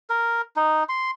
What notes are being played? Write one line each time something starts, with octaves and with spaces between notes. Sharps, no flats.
A#4
D#4
C6